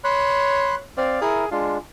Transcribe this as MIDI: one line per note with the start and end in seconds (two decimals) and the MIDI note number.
0.04 0.85 73
0.04 0.75 83
0.04 0.75 84
0.04 0.75 90
0.97 1.18 60
0.97 1.21 74
0.97 1.21 77
1.21 1.45 64
1.21 1.49 68
1.21 1.45 70
1.51 1.78 56
1.51 1.78 62
1.51 1.77 65